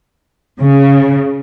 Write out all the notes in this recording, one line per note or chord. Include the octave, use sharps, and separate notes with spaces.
C#3